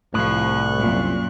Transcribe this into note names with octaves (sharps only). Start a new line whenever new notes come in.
C2 A2 F3 C#6 F#6
F#2 A#2